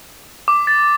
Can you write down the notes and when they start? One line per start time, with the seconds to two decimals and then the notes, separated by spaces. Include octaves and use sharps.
0.48 D6
0.67 A6